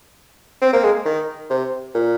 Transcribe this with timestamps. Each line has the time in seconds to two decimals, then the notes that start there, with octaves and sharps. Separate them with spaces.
0.62 C4
0.73 A#3
0.84 G#3
1.05 D#3
1.50 C3
1.94 A#2